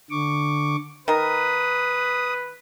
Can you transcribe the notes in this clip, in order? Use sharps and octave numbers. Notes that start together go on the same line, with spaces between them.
D3 C#6 D6
D#3 A#4 B4 D#6